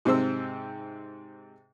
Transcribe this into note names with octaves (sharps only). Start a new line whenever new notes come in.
G#2 C3 C4 C5 E6